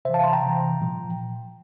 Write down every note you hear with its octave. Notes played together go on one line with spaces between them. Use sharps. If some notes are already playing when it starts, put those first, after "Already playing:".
C3 E3 C5 E5 F5 A5
A5 C6
G5 A#5
C3 E3
A#2 F3